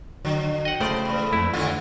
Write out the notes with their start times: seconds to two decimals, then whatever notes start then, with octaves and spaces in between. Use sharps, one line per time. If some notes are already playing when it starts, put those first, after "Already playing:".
0.25 D3 F#3
0.65 D#5 F#5 G5
0.80 A2 C#3 A3 C5 D5
1.05 E2 B5
1.33 F2 F3 A3 E4
1.53 D#2 D3 F4 F#5